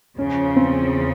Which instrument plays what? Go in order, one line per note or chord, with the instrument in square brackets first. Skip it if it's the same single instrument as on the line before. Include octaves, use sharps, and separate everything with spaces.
[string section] E2 C#3 F3 [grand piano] C#4
[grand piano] C4